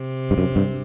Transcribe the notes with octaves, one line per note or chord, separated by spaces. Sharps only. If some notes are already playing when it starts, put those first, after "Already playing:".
Already playing: C3
G2
F#2
G2